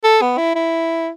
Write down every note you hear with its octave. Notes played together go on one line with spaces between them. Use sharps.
A4
B3
E4
E4